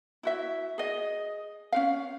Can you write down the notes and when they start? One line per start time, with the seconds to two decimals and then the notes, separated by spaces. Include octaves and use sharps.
0.23 E4 F#4 E5
0.78 G#4 D#5
1.72 C#4 F#4 F5